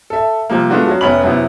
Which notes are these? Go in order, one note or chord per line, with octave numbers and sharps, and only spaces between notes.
A4 E5
C3 F3 G3 A#3
G#3 A3 B3 D4 F4 F#4
F#3 C#4 F#4
F1 B3 C#4 E5 B5 F#7
F#2 C3 B3 E4